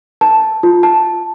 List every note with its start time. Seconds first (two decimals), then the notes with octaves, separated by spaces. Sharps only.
0.21 A5
0.63 F4
0.83 A5